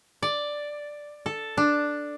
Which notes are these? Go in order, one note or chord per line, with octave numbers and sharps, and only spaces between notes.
D5
A4
D4